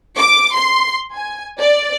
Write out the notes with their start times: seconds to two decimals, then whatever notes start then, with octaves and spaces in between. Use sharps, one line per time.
0.18 D6
0.54 C6
1.14 G#5
1.59 D5